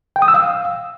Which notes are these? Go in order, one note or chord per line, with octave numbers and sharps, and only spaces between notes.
G5
D#6
E6
F5